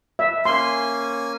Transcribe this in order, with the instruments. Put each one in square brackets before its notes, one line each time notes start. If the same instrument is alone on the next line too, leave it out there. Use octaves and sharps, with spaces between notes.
[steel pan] E5
[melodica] A#3 C#4 G#5 [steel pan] C6